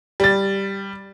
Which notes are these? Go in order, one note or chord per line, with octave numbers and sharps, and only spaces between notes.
G3 A6